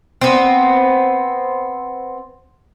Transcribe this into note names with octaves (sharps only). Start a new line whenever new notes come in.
B3 C4